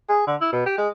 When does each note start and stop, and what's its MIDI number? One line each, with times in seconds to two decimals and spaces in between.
0.09 0.25 68
0.27 0.36 50
0.41 0.52 64
0.53 0.65 47
0.66 0.77 67
0.78 0.88 56